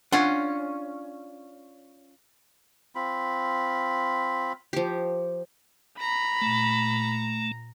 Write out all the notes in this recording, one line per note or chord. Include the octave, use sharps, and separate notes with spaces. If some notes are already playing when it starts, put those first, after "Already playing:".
C#4 D4 F4 F#5
C4 F4 B5
F3 G4
A#5 B5
A#2 A3